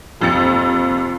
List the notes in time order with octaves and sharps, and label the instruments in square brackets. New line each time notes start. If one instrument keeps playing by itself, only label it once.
[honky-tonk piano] A#1 F2 C3 A6 C#7